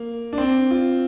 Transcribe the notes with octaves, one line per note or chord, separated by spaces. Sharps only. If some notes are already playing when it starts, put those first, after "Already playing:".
Already playing: A#3
D4
C4
F4